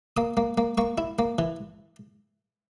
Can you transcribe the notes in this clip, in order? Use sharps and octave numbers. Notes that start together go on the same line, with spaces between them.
A#3 D#6
A#3
A#3
A#3 C#6
E4
A#3
E3